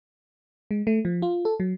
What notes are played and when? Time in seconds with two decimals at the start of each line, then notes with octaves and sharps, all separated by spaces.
0.71 G#3
0.87 A3
1.05 F3
1.22 F4
1.45 A4
1.60 F#3